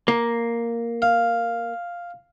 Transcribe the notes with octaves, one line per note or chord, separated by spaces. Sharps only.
A#3
F5